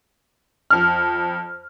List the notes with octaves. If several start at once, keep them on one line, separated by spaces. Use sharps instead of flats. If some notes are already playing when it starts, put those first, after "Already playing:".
F2 F6